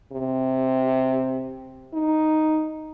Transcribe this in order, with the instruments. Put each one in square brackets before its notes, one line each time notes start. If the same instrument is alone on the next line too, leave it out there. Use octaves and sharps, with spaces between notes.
[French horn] C3
D#4